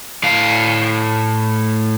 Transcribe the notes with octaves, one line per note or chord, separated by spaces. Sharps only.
A2 F5